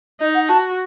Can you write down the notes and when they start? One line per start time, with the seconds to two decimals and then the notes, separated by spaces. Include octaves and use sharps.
0.20 D#4 D#5
0.34 F#5
0.49 F#4 A5